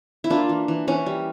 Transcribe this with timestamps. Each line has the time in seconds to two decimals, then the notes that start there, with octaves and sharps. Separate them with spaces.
0.24 E4
0.30 A#3 D4 F4
0.49 E3
0.68 E3
0.87 E3 C#4
1.06 G3